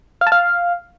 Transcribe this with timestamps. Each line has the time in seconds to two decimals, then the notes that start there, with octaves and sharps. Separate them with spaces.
0.21 F5
0.27 A5
0.32 F5